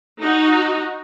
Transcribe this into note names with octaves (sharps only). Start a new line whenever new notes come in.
D#4 F#4